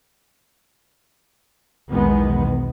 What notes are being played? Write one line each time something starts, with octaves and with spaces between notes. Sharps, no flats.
B1 E2 D#3 G#3 B3